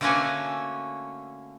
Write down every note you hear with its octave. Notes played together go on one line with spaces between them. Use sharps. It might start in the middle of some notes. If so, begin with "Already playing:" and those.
D3 A3 A#3 C#4 F#4 G#5